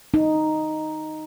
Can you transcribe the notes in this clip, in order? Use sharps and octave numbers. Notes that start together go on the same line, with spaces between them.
D#4